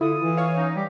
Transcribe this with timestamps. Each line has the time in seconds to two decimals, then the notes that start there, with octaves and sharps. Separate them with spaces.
0.01 D3 E4 F4 A4 D#6
0.21 E3
0.37 C#5 F5
0.56 C#4 D#4
0.76 G3 G4